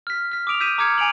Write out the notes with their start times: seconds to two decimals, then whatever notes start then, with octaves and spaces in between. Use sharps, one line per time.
0.07 F6 B6
0.32 F6 B6
0.47 D6 D#6 D7 F7
0.60 E6 G6 B6 D#7 E7
0.78 A#5 D6 E6 F6 G#6 C#7
0.98 G#5 D7 F7 F#7